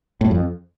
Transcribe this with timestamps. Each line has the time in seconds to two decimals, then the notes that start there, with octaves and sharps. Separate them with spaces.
0.21 A2
0.26 F#2
0.31 F2